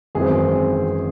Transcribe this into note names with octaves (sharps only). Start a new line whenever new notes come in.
G#1 F#2 E3 C4 G#4